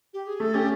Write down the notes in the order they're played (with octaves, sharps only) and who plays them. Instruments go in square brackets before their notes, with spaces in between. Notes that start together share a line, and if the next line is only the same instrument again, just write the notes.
[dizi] G4
G#4
[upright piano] A3 [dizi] A4
[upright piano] C#4 [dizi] G4